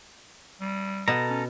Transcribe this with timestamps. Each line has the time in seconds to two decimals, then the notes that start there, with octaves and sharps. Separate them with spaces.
0.60 G3
1.08 B2 A4 A#5
1.30 C#4